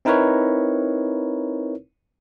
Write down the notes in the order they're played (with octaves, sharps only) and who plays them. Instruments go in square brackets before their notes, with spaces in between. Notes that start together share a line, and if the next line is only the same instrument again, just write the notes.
[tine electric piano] C4 D#4 E4 A#4 B4 C#5